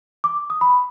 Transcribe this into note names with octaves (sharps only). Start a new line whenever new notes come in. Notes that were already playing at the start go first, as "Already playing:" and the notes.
D6
D#6
B5